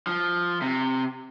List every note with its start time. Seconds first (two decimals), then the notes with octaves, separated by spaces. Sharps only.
0.07 F3
0.61 C3